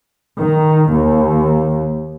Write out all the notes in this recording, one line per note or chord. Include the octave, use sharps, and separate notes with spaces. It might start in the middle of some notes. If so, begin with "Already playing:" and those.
D#3
D#2